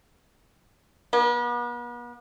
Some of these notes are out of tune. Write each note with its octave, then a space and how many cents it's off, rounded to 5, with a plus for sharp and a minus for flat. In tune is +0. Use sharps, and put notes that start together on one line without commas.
B3 -40